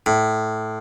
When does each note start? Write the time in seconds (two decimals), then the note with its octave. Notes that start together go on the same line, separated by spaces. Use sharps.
0.06 A2